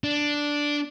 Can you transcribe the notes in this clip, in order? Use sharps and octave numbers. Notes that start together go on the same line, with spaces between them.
D4